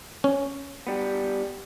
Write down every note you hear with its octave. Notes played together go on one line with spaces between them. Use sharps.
C#4
G3 B3